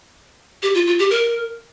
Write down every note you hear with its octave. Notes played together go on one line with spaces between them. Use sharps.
G4
F4
F4
G4
A#4